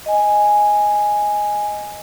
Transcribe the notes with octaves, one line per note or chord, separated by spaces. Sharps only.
D#5 G#5